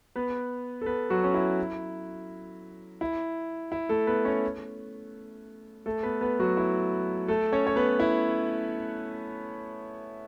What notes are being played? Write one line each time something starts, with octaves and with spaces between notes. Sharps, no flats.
B3 B4
A4
B3 B4
F#3 F#4
C#4
E4
E4
E4
A3 A4
B3 B4
C#4 C#5
A3 A4
B3 B4
B3 B4
F#3 F#4
E4
A3 A4
C#4 C#5
C#5
B3 B4
E4